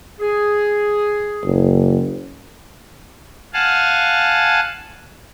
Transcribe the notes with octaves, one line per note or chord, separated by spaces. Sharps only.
G#4
F#1
F5 F#5 G#5 A5